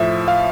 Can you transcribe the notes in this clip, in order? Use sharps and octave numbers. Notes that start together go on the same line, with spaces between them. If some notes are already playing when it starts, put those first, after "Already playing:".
Already playing: A2 F3 E5
F5